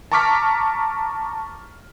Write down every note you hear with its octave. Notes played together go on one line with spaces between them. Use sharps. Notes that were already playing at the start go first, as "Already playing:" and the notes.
A5 A#5 C#6 D6 F6 B6